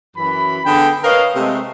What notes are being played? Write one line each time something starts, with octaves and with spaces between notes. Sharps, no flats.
F#2 E3 B5
D3 B3 G#4 A4 G5 B5
A#4 B4 C#5 D#5 F5
C3 G#3 A3